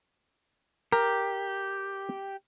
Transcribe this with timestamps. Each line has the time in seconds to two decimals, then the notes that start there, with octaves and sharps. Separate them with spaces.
0.92 G4 A#4